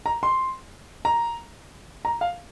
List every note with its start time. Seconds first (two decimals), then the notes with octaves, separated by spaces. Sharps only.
0.06 A#5
0.23 C6
1.05 A#5
2.05 A#5
2.21 F5